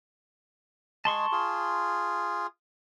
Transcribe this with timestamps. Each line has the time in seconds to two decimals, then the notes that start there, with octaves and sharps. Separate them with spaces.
1.05 G#3 G#4 A5 C6 C#6
1.32 F4 G#4